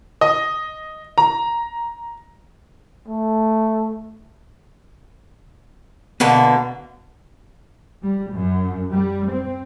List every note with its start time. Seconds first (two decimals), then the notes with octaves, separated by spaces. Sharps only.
0.21 D#5
1.18 A#5
3.08 A3
6.20 B2 D3 A#3 B3
8.02 G3
8.32 F#2
8.91 G3
9.29 C4